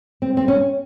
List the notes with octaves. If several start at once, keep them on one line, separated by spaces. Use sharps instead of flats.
C4
C4
C#4